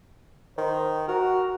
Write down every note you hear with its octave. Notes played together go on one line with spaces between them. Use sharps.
D#3 C5
F#4 A#4